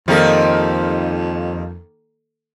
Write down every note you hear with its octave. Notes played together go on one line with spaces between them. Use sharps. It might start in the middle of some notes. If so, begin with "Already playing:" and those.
F2 D#3 F3 G3 A#3 D#4 A4